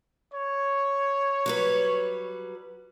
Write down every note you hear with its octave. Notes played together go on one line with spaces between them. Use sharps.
C#5
F#3 G3 B4